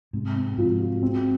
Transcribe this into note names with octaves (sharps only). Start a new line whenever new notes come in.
G#2 C3
C4
G#2 F3
F#4
C4